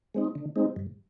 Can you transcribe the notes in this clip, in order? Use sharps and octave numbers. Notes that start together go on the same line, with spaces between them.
G#3 C4 D#4
D3
G#3 C4 D#4
G2